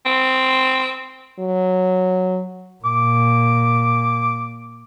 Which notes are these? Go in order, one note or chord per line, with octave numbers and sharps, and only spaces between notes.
C4
F#3
A#2 D6